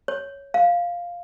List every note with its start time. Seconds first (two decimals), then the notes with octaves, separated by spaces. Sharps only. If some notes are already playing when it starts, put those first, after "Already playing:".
0.08 C#5
0.54 F5